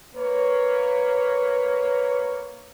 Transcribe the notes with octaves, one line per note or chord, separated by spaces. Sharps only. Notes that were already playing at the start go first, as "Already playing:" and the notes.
A#3 B4 C#5